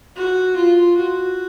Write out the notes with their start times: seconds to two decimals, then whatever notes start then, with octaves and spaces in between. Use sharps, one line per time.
0.16 F#4
0.56 F4
0.97 F#4